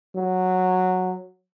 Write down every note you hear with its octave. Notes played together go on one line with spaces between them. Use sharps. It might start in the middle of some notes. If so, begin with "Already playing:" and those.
F#3